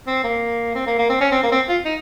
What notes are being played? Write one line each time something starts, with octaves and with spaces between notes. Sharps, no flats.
C4
A#3
C4
A#3
A#3
C4
C#4
C4
A#3
C4
F4
D#4